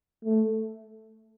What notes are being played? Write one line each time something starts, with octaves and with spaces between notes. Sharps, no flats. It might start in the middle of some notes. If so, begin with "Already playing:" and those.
A3